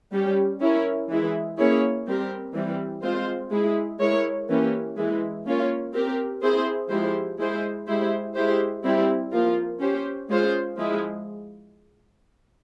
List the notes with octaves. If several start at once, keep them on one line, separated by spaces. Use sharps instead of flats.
G3 C#4 G4
C#4 E4 A#4 C#5
E3 G#3 E4 G#4
A#3 C#4 E4 G#4 C#5
G3 C4 G4 A#4
E3 G3 C4
G#3 C4 F4 C5
G#3 E4 G#4
G#3 E4 A#4 C#5
E3 A#3 C#4 G4
E3 G#3 E4
A#3 C#4 F4 A#4 C#5
C4 G4 A#4
C4 E4 G#4 C5
F3 G#3 E4 G4 C5
G#3 E4 G#4 C5
G#3 E4 G4 C5
G#3 E4 G4 C5
G3 C4 E4 G4
F3 A#3 F4 A#4
C#4 G4 C5
G#3 C#4 F4 G#4 C5
F3 G#3 E4 G#4